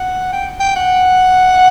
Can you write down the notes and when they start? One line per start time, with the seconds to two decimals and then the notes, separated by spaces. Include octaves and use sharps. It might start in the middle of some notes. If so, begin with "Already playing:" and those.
Already playing: F#5
0.33 G5
0.60 G5
0.76 F#5